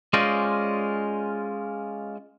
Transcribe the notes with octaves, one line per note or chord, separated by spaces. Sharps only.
G#3 C#4 F4 C5 D5 D#5